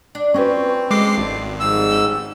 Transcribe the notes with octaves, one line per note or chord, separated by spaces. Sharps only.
D4
C4 C#4 F4 F#4 B4 C#5
G#3 F#4 A4 C5 D6 C7
G#1 D5
G#2 F3 G3 F5 E6
G2 C#4 G4